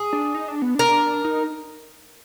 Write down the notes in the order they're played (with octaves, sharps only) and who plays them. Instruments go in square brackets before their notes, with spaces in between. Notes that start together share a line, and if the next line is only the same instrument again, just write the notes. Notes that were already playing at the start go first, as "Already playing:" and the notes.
Already playing: [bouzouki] G#4
[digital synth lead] D4
D#4
D4
B3
[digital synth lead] D4 [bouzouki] A#4
[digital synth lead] D#4